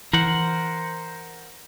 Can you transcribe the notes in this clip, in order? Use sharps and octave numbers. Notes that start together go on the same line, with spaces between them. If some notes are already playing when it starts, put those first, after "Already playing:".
E3 A#4 C5 F#5